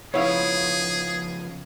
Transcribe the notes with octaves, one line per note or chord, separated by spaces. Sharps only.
C#3 F3 B3 E4 G#4 C#5 F5